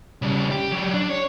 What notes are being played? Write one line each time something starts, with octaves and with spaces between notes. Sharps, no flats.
C#3 G3
G4
F#3 G4
D4
C#5